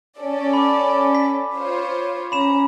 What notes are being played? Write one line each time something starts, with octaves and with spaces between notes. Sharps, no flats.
C#4 A4 D5
B5 D6
B6
F4 C5 C#5
C#4 A#5 B5 E7